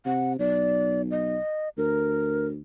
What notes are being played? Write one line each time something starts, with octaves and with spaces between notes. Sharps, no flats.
C3 F#5
B1 D5
D#5
D2 A#4